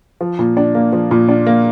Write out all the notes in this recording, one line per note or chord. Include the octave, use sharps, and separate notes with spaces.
F3
A#2
D4
A#3
F3
A#2
D4
A#3